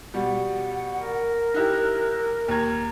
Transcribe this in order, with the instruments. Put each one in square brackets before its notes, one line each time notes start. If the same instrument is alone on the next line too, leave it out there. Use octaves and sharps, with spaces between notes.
[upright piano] B2 G3 [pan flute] F#5
[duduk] A#4
[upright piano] D#4 E4 G4 [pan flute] F#6
[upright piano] D#2 G#6 [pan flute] A#5